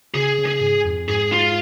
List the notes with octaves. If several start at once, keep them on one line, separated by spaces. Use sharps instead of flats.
C#3 G#4
C#3
G#4
G#2
F2
G#2 G#4
F4